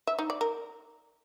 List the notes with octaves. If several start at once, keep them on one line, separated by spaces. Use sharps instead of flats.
E5
D#4
D5
A#4